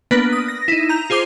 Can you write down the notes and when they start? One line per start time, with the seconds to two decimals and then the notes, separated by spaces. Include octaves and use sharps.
0.11 A#3 B3 D4 B4
0.33 D#6
0.48 A#6
0.68 D#4 E4
0.89 A#5 G6 F7
1.10 F4 G#4 C5 D6